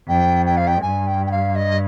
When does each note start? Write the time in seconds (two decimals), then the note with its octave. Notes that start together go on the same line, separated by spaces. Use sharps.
0.08 F2 G5
0.46 G5
0.57 F5
0.67 G5
0.82 G2 G#5
1.07 G5
1.26 G5
1.31 F5
1.55 D#5